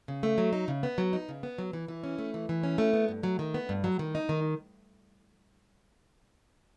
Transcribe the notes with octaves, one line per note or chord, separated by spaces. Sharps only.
C#3
A3
F#3
D#4
C#3
B3
F#3
D#4
C#3
B3
F#3
E3
E3
C#4
A3
E3
E3
C#4
A3
B3
G2
F#3
D#3
B3
G2
F#3
D#3
D#4
D#3